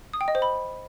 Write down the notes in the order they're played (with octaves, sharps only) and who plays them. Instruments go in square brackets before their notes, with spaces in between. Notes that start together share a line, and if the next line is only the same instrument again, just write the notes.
[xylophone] D#6
G5
D#5
C5
B5